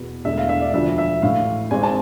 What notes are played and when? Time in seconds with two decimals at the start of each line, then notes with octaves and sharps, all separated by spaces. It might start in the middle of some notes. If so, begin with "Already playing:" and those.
Already playing: E2 B2 B3
0.25 E1 E2 D3 A3 E5
0.37 F5
0.49 E5
0.61 D5
0.74 E1 D2 D3 F3 E5
0.98 E5
1.22 A1 A2 E3 F5
1.71 G#1 G#2 G#3 C4 G#5
1.83 A5